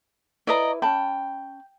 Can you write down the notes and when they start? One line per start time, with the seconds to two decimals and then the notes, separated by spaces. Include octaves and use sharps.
0.47 E4 B4 D5 D#5 A#5
0.82 C#4 G5 A5 B5